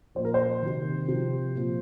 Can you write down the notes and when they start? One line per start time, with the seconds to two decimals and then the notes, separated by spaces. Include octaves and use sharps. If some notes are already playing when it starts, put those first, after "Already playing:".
0.15 A#2 F3 C5
0.25 A#4
0.34 C5
0.63 C3 D#3
1.08 C3 F3
1.55 A#2 F3